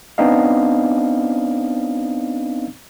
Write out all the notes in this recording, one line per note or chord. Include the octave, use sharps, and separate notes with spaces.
B3 C4 D4 D#4 D#5 F5